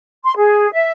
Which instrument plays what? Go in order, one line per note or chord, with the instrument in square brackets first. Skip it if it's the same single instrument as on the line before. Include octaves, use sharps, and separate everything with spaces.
[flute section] C6
G#4
E5